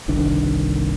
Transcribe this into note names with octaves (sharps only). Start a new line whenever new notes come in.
G1 C2 D#3 D4